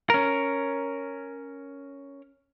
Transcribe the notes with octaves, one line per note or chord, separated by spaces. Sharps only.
C#4 A#4